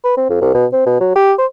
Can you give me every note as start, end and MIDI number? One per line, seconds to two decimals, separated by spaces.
0.04 0.15 71
0.17 0.27 60
0.30 0.37 41
0.41 0.53 36
0.54 0.66 47
0.73 0.85 60
0.86 1.00 47
1.00 1.13 54
1.16 1.33 67
1.38 1.46 72